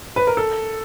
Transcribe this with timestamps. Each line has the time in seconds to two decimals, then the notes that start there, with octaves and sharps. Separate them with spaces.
0.16 B4
0.27 A#4
0.37 A4